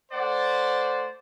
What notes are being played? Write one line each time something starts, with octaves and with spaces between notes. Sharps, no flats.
A3 C5 D5 F#5